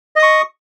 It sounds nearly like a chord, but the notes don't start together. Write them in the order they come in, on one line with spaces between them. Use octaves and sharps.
D#5 D#6 C#6